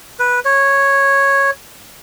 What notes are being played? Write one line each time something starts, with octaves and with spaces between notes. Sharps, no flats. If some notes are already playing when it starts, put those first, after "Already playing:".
B4
C#5